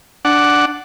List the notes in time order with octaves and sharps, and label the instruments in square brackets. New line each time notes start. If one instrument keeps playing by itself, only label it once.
[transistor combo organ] D4 F#5